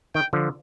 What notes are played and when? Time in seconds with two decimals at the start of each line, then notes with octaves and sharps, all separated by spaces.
0.15 D#3 G5
0.33 D3 F3